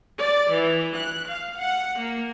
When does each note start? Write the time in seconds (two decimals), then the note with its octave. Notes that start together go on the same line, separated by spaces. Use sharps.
0.21 D5
0.54 E3
0.99 F#6
1.31 F5
1.61 F#5
2.00 A#3